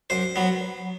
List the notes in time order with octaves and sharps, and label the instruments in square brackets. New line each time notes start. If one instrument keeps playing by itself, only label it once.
[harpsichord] F#2 C5
F#3 B3